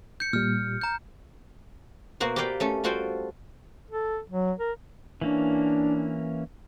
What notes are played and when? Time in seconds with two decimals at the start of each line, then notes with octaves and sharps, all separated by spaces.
0.20 G6 C#7
0.33 A#2 G3 F6
0.81 A#5 G6
2.20 B2 A#3 F#4 C5
2.36 G4 A#4 B4 D5 F5 G5
2.60 A3 C#4 A4
2.84 G3 F4 F#4 A4 C5 G5
3.91 A4
4.30 F#3
4.59 A#4
5.22 E3 A#3 C#4 D4